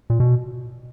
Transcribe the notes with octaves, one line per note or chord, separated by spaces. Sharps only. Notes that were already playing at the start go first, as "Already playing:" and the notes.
A#2
B2